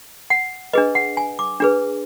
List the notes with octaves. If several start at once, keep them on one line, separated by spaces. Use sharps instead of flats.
F#5
D4 G#4 B4 D#5
F#5
G#5
D6
D4 G#4 B4